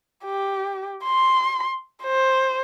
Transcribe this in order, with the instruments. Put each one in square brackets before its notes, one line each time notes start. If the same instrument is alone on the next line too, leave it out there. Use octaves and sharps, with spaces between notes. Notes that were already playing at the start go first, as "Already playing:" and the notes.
[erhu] G4
C6
C5